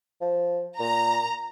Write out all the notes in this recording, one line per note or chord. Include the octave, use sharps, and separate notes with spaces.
F3
A#2 A#5